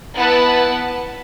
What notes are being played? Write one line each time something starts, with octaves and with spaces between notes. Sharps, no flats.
B3 E4 B4 F#5 A5